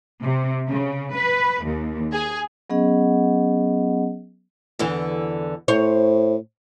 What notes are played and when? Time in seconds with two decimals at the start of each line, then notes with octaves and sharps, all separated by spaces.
0.21 C3
0.68 C#3
1.14 B4
1.64 D#2
2.13 G#4
2.70 F#3 B3 C#4 G#4 D#5 F#5
4.79 E2 D3 E3
5.68 A2 C5 C#5